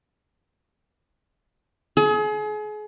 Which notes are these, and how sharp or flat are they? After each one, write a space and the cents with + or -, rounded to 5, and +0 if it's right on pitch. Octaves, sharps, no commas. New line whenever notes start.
G#4 +35